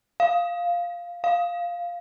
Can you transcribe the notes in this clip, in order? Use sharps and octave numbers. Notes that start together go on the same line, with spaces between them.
F5
F5